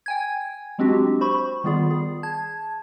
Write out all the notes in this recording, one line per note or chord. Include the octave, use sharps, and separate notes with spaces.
G5 G#5 G#6
F#3 G#3 C4 D4 F#4 G4
C5 B5 C#6
D#3 G3 B3 F4 G#4 D5
G#4
A5 G#6